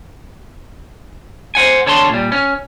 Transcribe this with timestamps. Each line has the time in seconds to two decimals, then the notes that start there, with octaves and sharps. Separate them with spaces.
1.55 C5 F#5 G#5
1.86 D3 C#5 A5 C6
2.10 A#2 G3
2.32 C#4